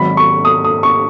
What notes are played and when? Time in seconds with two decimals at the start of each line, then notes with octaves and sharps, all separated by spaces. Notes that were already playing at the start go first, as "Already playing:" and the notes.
Already playing: G#1 G#2 F#3 B5
0.17 C#6
0.45 D#6
0.65 D#6
0.83 C#6